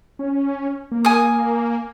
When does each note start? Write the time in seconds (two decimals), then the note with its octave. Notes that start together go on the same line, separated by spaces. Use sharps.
0.19 C#4
0.92 A#3
1.05 G#5 D#6